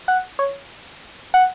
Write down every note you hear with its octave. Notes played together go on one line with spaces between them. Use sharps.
F#5
C#5
F#5